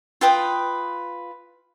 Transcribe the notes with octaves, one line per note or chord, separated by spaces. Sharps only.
F4 B4 G5 D#6